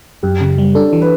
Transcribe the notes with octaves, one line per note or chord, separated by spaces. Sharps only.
F#2 G4
C#3
G3
D4 A4
E3
B4